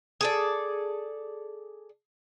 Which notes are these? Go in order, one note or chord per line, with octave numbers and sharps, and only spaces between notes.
G#4 A4 D5